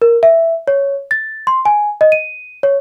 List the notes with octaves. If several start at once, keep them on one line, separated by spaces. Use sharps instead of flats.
A#4
E5
C#5
A6
C6
G#5
D#5
D#7
C#5